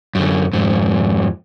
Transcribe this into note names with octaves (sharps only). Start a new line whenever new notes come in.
F#2 D3
F2 G#2